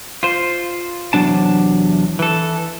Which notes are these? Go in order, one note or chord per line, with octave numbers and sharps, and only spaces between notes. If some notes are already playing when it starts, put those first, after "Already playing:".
F4 C5
E2 C3 F#3 D4 A5
E3 A4